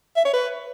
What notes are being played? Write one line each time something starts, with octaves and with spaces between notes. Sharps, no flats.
E5
C#5
B4